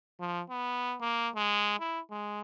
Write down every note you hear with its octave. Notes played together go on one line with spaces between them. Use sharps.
F3
B3
A#3
G#3
E4
G#3